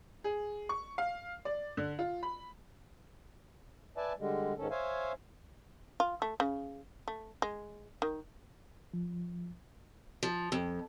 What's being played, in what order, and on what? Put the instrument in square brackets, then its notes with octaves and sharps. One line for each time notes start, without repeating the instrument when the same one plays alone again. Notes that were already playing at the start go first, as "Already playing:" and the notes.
[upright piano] G#4
C#6
F5
D5
D3
F4
B5
[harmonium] B4 D5 E5 G#5 A5
D3 G3 G#3
G#2 D#3 C#4 A4
C5 C#5 E5 F5 G#5
[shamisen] F4
A3
C#3
A3
G#3
D#3
[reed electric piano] F3
[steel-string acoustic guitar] F3
F2